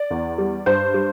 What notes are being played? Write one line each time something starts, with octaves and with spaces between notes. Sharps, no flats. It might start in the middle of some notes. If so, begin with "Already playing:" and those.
Already playing: D5
E2
G3
G2 C5
G3